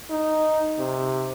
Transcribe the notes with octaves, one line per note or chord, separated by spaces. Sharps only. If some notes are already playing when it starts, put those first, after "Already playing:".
D#4
C3